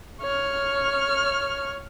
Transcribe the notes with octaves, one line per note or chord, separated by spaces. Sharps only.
C#5 F6